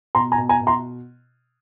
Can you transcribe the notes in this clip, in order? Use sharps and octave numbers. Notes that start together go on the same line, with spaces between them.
B2 A#5 C6
G#5 A#5
B2
G#5 A#5
B2
A#5 C6